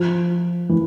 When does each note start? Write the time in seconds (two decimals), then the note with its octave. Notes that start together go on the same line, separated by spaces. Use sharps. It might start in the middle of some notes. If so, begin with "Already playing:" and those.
Already playing: F3
0.69 E3